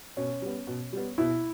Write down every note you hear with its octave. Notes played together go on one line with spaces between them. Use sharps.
B2 C#4
G3 B3
B2
G3 B3
B2 E4